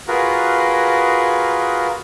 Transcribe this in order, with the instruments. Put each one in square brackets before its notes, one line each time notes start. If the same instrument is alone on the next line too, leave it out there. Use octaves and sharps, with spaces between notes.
[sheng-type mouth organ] F4 F#4 G#4 A#4 B4